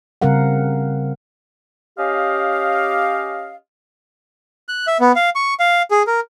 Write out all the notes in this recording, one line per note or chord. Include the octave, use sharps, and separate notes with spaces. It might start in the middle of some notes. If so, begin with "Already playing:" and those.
C#3 G3 C4 A#4 F5 F#5
C#4 G4 D#5 F5
F#6
E5
B3
F5
C#6
F5
G#4
A#4